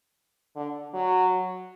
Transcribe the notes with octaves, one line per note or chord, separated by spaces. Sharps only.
D3
F#3